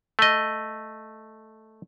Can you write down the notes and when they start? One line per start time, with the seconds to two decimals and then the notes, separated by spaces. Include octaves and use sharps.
0.19 A3 D#5